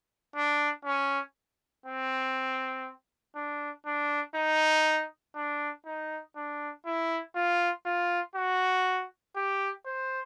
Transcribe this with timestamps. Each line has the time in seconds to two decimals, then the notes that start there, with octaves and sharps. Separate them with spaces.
0.36 D4
0.85 C#4
1.86 C4
3.35 D4
3.86 D4
4.35 D#4
5.35 D4
5.85 D#4
6.36 D4
6.86 E4
7.35 F4
7.86 F4
8.35 F#4
9.36 G4
9.86 C5